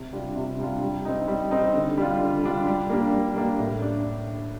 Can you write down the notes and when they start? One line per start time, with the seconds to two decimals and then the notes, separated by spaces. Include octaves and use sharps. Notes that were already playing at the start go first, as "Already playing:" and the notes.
Already playing: C3
0.13 G3 D4 F4
0.36 C3
0.59 G3 D4 F4
0.82 G3
1.05 C4 D#4
1.28 G3
1.51 C4 D#4
1.74 D3
1.98 G3 D4 F4
2.21 D3
2.44 G3 D4 F4
2.67 G3
2.90 A#3 D4 G4
3.13 G3
3.36 A#3 D4 G4
3.59 A2
3.82 D4